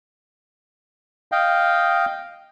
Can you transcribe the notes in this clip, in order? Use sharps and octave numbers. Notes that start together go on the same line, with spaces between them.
D#5 F5 G5